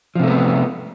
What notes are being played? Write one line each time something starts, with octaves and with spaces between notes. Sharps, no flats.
C3 F3 A3 B3